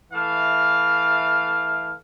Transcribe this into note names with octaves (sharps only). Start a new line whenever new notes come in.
E3 A3 F5